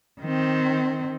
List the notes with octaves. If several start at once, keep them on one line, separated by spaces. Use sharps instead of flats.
D#3 C4